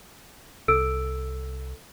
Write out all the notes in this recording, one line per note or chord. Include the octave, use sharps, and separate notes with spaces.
C2 A4 E6 D7